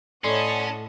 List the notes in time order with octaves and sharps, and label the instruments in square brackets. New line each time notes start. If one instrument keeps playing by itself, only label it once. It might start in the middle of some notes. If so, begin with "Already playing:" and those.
[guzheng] A2 [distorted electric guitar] C#4 [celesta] D5 C6 C7 [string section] D#5 F#5 A5